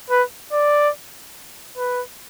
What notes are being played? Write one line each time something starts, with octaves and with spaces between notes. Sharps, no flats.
B4
D5
B4